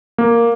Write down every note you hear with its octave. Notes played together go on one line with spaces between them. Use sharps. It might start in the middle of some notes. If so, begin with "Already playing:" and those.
A#3